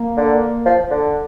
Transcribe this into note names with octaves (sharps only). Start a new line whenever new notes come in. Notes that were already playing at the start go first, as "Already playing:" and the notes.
Already playing: A#3
D3
F3
D3